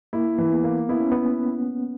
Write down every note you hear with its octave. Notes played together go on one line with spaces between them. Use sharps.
A#3 E4
E3
B3
A#3
B3 E4
C#4
B3 E4